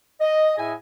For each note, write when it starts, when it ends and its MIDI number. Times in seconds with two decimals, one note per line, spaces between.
0.21 0.57 75
0.58 0.73 45
0.58 0.73 68
0.58 0.73 75
0.58 0.73 76
0.58 0.73 80